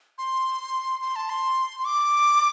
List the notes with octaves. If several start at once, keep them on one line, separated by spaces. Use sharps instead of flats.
C6
C6
A5
C6
C6
D6